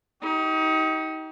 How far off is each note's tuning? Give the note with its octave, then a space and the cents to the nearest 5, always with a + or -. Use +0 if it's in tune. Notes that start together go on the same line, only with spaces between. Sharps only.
D#4 +25 G4 -25